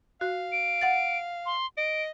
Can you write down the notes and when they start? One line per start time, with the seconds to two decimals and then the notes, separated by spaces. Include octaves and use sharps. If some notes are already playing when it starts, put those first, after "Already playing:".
0.21 F#4 F5
0.52 D7
0.81 F#5 A6
1.46 C6
1.77 D#5 D7